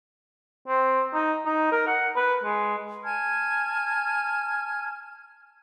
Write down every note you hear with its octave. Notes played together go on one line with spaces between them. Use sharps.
C4
D#4
D#4
A#4
F#5
B4
G#3
G#5 A5 F6 G#6